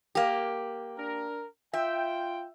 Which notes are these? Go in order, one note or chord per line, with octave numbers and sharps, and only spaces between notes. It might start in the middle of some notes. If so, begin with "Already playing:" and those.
A#3 G4
D4 A#4
F4 E5 G5